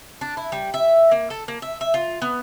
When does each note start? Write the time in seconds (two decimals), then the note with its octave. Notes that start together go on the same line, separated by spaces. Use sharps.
0.21 D4
0.37 E4
0.52 G3
0.74 E5
1.11 A#3
1.30 A4
1.48 A#3
1.62 E5
1.81 E5
1.94 F4
2.22 B3